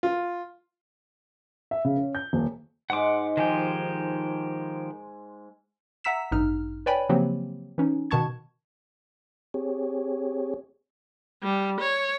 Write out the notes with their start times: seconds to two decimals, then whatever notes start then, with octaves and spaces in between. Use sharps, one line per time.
0.03 F4
1.71 E5
1.85 C#3
1.97 C#4
2.15 G6
2.33 D#1
2.90 G#2 G#3 F#5 C6 D6
3.37 D#3 F3 G4 F#5 G#5
6.04 E5 F#5 A#5 E6 B6 E7
6.32 A1 G2 D#4 F6
6.86 B4 C#5 D5 G5 G#5 B5
7.09 C#3 F3 F#3 A#3 C4 G4
7.78 E3 C#4 D#4
8.11 B2 D#3 A5 C#6 G#6
9.54 C4 G4 G#4 C#5
11.43 G3
11.80 C#5